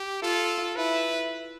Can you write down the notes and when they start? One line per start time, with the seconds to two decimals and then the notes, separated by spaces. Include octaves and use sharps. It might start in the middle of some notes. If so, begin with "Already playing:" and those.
Already playing: G4
0.22 F4 A4
0.76 E4 B4